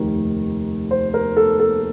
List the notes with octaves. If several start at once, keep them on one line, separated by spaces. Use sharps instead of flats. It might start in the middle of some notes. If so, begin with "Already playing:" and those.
Already playing: F1 D#2 D#3 A#3
C5
A#4
A4
A4